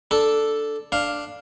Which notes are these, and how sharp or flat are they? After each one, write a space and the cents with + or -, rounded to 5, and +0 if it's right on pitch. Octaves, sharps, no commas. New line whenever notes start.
D4 +0 A4 +0
D4 +0 F5 +0